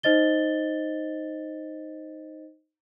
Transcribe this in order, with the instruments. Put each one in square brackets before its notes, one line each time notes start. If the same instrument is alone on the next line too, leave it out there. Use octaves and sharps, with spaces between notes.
[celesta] D#4 C5 D#5 A6 G7